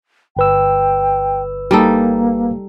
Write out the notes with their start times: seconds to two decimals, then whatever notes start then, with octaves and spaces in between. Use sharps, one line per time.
0.37 G1 B4 G5 E6
1.71 G3 A#3 D#4 A4